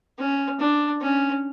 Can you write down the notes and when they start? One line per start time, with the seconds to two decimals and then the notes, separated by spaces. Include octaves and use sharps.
0.19 C#4
0.60 D4
1.02 C#4